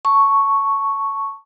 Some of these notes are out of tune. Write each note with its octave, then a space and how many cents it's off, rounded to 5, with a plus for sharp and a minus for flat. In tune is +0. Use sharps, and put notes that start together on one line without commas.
A5 +15 C#6 +0